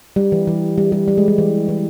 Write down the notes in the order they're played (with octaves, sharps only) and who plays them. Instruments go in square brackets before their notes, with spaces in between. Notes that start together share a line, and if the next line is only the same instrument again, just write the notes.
[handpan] G3
E3
E3
G3
G3
G3
G#3
G3
E3
E3